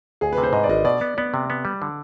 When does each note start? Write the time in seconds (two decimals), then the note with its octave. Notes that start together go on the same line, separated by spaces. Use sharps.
0.21 D2 G#4
0.32 B4
0.38 C3
0.43 C5
0.53 G#2 D#5
0.63 D5
0.69 G#1 D#5
0.85 B2 D5
1.01 B3
1.17 B3 D5
1.34 C3
1.50 B3
1.65 G3
1.82 D3